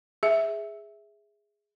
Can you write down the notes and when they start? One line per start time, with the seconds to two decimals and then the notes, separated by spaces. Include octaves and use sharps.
0.23 G#4 E5